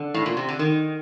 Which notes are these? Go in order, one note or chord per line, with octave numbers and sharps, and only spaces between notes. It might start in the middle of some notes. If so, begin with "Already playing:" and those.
Already playing: D3
A2
A#2
C3
D3
D#3